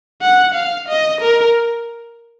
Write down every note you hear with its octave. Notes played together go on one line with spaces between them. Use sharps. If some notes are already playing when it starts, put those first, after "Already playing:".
F#5
F5
D#5
A#4